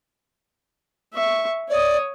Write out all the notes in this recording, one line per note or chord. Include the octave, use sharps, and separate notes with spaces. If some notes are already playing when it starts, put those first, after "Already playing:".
E5 C#6
C#5 D5 D#6